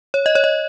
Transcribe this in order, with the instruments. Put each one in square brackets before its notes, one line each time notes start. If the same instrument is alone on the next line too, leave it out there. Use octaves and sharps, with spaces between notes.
[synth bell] C#5
D#5
C#5
D#5